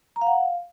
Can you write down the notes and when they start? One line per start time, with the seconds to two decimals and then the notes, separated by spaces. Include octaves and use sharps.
0.16 A#5
0.21 F5
0.27 F#5
0.32 F5